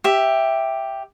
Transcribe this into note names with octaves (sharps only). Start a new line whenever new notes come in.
G4 E5